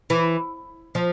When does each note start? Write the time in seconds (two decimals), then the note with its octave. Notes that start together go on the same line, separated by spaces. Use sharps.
0.10 E3
0.95 F3